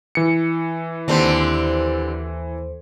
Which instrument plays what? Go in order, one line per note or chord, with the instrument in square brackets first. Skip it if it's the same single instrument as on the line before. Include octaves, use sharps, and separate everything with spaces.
[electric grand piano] E3 C#7
[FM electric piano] D#2 A4 C5 [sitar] D3 G3 C4